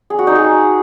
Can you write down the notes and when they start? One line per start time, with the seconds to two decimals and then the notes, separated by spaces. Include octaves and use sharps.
0.10 G#4
0.19 F#4
0.27 D#4
0.35 G#4